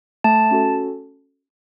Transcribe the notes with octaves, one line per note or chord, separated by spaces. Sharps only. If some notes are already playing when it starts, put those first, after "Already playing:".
A3 A5
C#4 F#4 A4